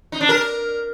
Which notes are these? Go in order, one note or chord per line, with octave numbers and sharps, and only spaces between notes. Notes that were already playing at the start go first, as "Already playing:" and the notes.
D#4
D4
A#4